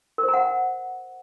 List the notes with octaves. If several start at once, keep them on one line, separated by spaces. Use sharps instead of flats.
A#4
C5
A#5
F#5